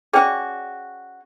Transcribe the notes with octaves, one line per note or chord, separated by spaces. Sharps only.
C#4 F#4 G#4 D5 G5